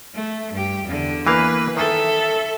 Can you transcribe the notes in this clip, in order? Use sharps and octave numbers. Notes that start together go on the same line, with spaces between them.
A3
G2 G4
E2 D3
E3 A#3 B4 F5
D#3 A4 E5